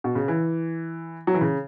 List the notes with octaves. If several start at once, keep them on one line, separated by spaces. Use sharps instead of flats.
B2
C#3
E3
F#3
E3
C#3